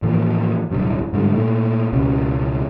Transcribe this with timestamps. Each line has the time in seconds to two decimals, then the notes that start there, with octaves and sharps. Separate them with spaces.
0.02 A2 E3 F3 A#3
0.71 D1 B1 G2
1.13 G#2 D3 F3 G3
1.34 A#2 A3
1.92 C#2 B2 C#4